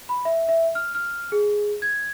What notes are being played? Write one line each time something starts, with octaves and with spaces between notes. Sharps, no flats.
B5
E5
E5
F6
F6
G#4
G#6